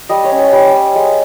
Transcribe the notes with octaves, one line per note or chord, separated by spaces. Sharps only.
G3 D#5
C#5
C#4
C#5
G3
C#4
G#3